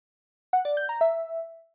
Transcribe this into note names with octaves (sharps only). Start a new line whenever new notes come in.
F#5
D5
G6
A#5
E5